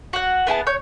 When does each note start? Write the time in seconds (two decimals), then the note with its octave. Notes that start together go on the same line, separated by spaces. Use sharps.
0.13 F#4 F#5
0.47 B3 E4 G#4 A5
0.67 C#5 G6